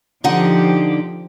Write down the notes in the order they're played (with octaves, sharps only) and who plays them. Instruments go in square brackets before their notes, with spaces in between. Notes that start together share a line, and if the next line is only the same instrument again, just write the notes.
[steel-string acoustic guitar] D3 D#4 F#5 [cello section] F3 G4